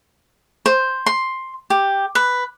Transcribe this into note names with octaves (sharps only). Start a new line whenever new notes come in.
C5
C6
G4
B4